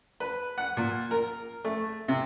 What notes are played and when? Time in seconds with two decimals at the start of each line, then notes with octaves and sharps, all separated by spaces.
0.20 B4
0.58 F#5
0.77 A#2
1.11 A#4
1.65 A3
2.08 C3